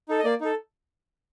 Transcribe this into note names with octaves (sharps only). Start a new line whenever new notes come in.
D#4 A4
D#5
A#3 D5
D#4 A4